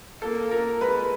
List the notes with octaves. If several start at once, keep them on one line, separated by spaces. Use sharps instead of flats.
A#3 A4
A#4
G#3 B4